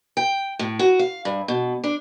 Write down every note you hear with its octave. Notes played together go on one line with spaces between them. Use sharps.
G5
A2
F#4
F5
G2
B2
D4